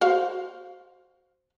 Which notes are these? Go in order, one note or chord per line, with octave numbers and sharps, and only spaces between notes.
F#4 C5 F5